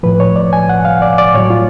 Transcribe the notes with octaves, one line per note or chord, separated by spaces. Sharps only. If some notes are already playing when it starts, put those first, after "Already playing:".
A2 F3 B4
C#5
D5
G#5
F#5
F5
D5
D5
A2 F#3 C#5
F4